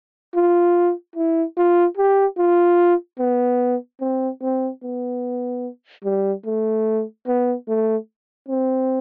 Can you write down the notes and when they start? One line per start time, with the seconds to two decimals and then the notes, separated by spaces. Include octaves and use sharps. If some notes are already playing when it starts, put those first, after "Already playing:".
0.35 F4
1.16 E4
1.57 F4
1.97 G4
2.38 F4
3.19 B3
4.01 C4
4.42 C4
4.83 B3
6.04 G3
6.46 A3
7.27 B3
7.68 A3
8.49 C4